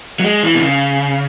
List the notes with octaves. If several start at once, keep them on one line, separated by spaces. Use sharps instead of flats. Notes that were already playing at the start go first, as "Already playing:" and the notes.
F#3
G#3
E3
B2
C#3